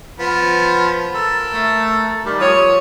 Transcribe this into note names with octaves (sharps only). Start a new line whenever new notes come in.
F3 B3
A4 A#4
A3
D#3 G3
F3 C#5 D#6